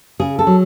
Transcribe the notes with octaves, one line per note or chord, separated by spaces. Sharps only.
C#3 G#4
A4
F#3